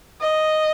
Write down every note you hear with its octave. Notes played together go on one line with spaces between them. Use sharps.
D#5